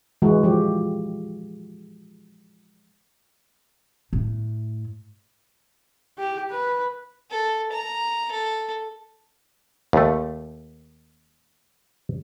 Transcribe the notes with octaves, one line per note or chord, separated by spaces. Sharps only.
E3 G#3 F#4
F3 G4
A2
G4
B4
A4
A#5
A4
D#2 A3